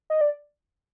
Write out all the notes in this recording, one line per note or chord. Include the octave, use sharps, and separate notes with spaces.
D#5
D5